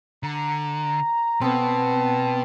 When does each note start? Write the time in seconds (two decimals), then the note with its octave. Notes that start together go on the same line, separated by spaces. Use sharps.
0.23 D3 A#5
1.41 B2 B3 C4 A5